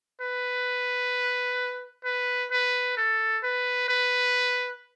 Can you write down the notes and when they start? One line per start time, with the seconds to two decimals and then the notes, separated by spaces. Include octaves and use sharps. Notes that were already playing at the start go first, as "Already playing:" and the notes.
0.21 B4
2.05 B4
2.52 B4
2.97 A4
3.43 B4
3.89 B4